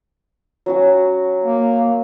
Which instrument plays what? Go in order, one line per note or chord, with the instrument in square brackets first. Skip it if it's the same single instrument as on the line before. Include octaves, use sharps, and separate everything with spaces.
[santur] F#3 C#4 F#4
[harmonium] A#3